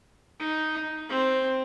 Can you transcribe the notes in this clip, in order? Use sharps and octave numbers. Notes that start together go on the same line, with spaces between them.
D#4
C4